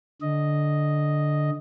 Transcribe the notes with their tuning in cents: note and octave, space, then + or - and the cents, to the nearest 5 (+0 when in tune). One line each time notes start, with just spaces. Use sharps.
D3 +0 D#5 +0